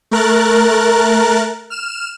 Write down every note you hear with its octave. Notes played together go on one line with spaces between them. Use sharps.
A3 A#4 F#6 A6
F6 E7